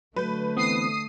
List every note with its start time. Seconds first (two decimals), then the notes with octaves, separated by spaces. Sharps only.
0.16 D3 F#3 A3 B4 G6
0.57 E3 B3 C4 D#6 C7 D#7